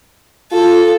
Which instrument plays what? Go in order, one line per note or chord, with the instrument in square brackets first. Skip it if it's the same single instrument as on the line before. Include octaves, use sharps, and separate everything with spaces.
[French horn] F4 [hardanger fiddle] A4